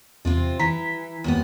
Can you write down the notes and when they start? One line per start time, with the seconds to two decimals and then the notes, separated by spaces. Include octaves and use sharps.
0.25 E2 C3 C4 F4
0.59 E3 A#5 B6
1.24 D#2 A#2 B3